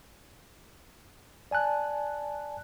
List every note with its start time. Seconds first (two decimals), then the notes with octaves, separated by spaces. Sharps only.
1.51 D5 G#5 A5 F#6